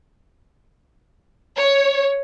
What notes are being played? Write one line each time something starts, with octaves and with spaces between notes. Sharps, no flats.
C#5